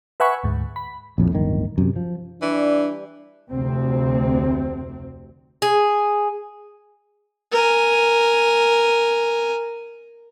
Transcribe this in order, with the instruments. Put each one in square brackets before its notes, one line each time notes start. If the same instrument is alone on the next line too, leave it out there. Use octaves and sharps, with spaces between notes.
[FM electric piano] B4 E5 F#5 G#5 B5 C#6
D2 G#2
B5
[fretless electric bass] A#1 F2 A2
D1 G1 D#3
F#2 C3
F3
[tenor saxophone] E3 [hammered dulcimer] G3 G4 D6 [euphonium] D4
[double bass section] F1 D2 C3 C4
[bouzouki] G#4
[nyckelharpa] A#4 G#5